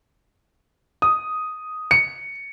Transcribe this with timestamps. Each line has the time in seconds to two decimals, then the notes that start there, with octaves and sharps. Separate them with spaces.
1.02 D#6
1.91 C#7